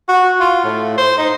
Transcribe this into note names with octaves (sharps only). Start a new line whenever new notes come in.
F#4
F4
A2
C5
D#4